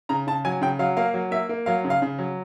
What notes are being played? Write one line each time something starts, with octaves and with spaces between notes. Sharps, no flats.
C#3 A#5
C#3 A5
F#3 G#5
C#3 G5
F#3 F5
A#3 F5
F#3
A#3 E5
A#3
F#3 F5
C#3
F5
C#3
F#3